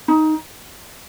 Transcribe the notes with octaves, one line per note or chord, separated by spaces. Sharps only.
D#4